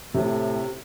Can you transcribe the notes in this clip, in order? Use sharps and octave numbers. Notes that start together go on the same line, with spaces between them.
A2 C3